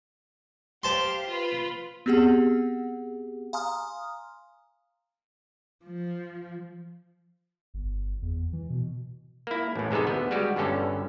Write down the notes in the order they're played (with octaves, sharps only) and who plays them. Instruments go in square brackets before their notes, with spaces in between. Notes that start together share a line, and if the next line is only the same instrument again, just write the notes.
[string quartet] G4 F5 [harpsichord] C5 A5 C6
[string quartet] F4 B4
[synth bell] B3 C4 G4 G#4 F#5
F5 G#5 A#5 C6 D#6 F6
[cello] F3
[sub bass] G1
E2
E3
B2
[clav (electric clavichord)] A#3 E4
A1 A2
G#2 C3 G#3 B3 A4
D2 B3
G3 G#3 F#4 G4
G1 G2 D3 C#4 A4